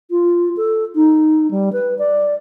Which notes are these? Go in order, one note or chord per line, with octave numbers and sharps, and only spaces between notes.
F4
A4
D#4
G3
B4
D5